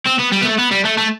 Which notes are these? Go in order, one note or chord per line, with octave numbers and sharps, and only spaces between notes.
C4
B3
G3
B3
A3
B3
G3
A3
A3